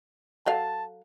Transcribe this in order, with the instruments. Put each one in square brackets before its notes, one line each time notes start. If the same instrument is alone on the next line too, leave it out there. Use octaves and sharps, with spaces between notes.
[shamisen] F#3 A4 F5 [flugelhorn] A5